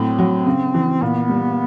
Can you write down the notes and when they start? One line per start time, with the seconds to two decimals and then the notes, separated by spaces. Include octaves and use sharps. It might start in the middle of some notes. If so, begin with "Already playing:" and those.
Already playing: A2 F#3 C4
0.19 F#3
0.46 C#3
0.74 E3
1.02 A#2 B3
1.29 G3